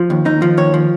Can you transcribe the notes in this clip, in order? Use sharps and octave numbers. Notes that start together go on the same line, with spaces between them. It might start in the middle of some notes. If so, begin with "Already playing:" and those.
Already playing: F3
D#2
D#2 D#4
F3
D#2 C#5
F3